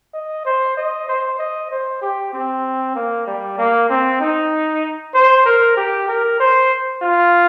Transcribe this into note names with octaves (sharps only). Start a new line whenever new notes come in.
D#5
C5
D#5
C5
D#5
C5
G4
C4
A#3
G3
A#3
C4
D#4
C5
A#4
G4
A#4
C5
F4